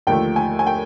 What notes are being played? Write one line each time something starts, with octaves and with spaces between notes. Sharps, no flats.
D#2 D3 F3 A3 G5
G#5
G#5
G5